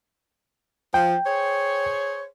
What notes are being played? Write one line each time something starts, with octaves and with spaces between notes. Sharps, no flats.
F3 G5
G#4 C5 C#5